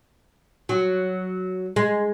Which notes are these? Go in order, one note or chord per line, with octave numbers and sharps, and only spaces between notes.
F#3
G#3